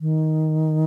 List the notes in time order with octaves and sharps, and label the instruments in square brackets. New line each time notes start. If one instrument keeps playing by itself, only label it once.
[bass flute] D#3